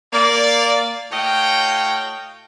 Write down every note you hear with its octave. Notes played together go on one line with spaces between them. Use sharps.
A#3 D5
A2 F#4 C#5 D#5 F5 G5